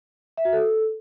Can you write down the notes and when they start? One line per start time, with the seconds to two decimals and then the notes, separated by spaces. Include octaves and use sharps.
0.37 E5
0.45 F#4
0.53 A4